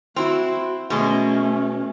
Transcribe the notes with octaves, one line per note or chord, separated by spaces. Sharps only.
C4 E4 F#4
B2 G#3 A3 C#4